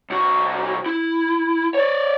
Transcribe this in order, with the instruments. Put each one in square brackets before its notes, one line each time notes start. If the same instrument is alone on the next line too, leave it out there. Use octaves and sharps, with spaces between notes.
[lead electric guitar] C2 F#4
E4
C#5 D5